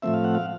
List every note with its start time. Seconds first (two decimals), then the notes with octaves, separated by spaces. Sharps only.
0.02 A2 F3 A3 C4 E5
0.14 F5
0.24 F#5
0.35 F5